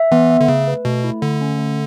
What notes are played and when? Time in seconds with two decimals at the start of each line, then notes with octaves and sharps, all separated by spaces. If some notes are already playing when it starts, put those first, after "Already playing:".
Already playing: E5
0.11 E3 B3
0.30 E5
0.41 D3
0.48 C#3 A3
0.68 B4
0.85 B2 A3
1.04 E4
1.22 D3 A3
1.41 C#4
1.58 A3